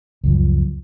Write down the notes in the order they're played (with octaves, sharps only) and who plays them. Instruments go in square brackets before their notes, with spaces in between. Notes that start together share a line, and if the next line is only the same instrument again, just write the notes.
[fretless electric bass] C#2 F#2 F3